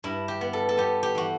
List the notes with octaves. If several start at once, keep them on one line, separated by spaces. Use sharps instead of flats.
G2 E4
G4
B3
A4
A4
B3 G4
G4
E3 F#4